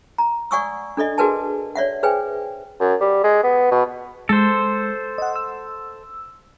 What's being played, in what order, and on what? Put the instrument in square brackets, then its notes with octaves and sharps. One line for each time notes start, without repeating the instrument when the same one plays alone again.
[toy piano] A#5
D5 F#5 G#5 C#6 D#6 E6
D4 A4 D5 D#5
F#4 G#4 A#4 B4 G#5 A5
C#5 D5 E5 F#5
G#4 B4 C5 G5 G#5
[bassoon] F#2
G3
G#3
B3
B2
[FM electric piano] G#3 [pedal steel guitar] A4 C5
[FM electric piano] D#5 F#5
E6